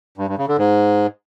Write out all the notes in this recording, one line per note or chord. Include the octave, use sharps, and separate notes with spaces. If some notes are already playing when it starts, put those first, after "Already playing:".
G2
G2
C#3
D3
G#2